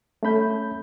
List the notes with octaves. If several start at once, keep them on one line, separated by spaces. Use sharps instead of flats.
A3 C#4 B5 G6